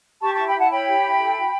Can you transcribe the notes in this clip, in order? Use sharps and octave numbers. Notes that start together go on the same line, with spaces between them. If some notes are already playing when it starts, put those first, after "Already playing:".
G4 A5 C#6
E4 A5 C#6
G5 B5
E4 F#5 A5
C#5 G5 B5
G4
E4
A4
F#4